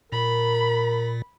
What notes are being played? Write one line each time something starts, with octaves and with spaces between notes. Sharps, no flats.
A#2 A#4 B5